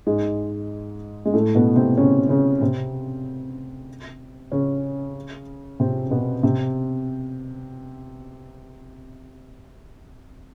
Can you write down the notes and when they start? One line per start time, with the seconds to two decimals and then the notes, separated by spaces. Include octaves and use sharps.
0.07 G#2 G#3
1.25 G#3
1.33 A2 A3
1.55 B2 B3
1.76 C3 C4
1.97 C#3 C#4
2.29 C#3 C#4
2.61 C3 C4
4.52 C#3 C#4
5.80 C3 C4
6.11 B2 B3
6.43 C3 C4